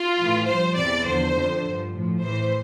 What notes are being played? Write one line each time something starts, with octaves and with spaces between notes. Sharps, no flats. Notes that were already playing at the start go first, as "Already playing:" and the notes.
Already playing: F4
A2 E3
G2 F3 C5
E2 C3 E3 D5
E2 D3 F3 C5
F2 D3 F3
G2 F3
A2 F3
A2 E3 C5